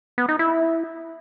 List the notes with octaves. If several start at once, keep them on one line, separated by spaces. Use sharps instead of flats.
B3
D#4
E4